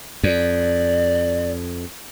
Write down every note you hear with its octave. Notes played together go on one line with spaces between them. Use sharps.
F2 D5